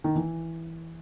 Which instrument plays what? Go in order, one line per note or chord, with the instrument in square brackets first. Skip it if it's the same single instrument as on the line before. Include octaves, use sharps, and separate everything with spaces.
[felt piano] D#3
E3